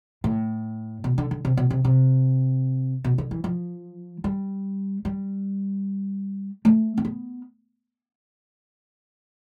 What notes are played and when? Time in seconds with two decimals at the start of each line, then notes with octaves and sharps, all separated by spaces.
0.24 A2
1.04 B2
1.18 D3
1.31 D3
1.45 C3
1.57 B2
1.70 C3
1.85 C3
3.04 B2
3.18 D3
3.31 E3
3.44 F3
4.24 G3
5.05 G3
6.65 A3
6.97 C4
7.05 B3